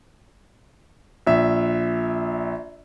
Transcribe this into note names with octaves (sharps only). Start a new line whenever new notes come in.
A#1 E5